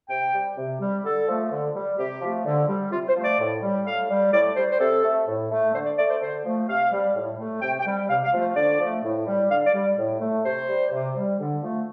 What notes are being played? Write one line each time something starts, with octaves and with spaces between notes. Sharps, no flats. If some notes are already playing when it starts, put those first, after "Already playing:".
C3 G5
G3
C3
G3
D3 A4
F3 A3
D3
G3
C3 G4
F3 A3
D3
G3
C3 F4
C5
F3 A3
D5
A2
G3
A2 F5
G3
A2 D5
G3 C5
C5
C3 A4
A3
A2
A3
D3 C5
D5
A3 D5
C5
D3 C5
F3 A3
C3 F5
G3
A2
A3
C3 G5
G5
G3
C3 F5
F5
F3 A3
C5
D3 D5
F3 A3
A2
G3
D3 F5
D5
G3
A2
A3
C3 C5
G3
C3
G3
D3
F3 A3